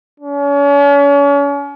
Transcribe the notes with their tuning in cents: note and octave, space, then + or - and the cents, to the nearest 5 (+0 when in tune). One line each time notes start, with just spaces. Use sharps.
C#4 +40